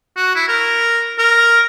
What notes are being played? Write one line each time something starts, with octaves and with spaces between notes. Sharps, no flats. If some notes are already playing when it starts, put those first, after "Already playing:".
F#4
E4
A#4
A#4